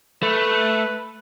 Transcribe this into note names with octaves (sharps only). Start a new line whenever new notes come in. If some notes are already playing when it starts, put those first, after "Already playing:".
A3 B4